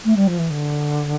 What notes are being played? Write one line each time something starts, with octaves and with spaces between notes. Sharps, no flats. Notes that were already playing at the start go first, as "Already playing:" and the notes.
A3
G3
F3
E3
D3